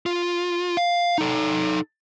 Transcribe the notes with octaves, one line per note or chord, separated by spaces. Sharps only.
F4
F5
D#4 A4